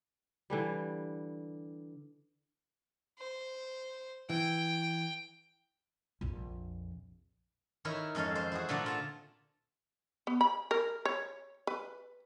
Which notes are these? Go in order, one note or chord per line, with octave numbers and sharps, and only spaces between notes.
D3 E3 G3
C5
E3 G5
A#1 F2
D#3 E4 A#4 C#5 B5
F2 G#3 C#4 A4 F5
C5
E4 F#4 G#4
A#2 D3 A3 G#4 F#5 A#5
F4 A5 A#5
B3
B5
A#4
C#5
B4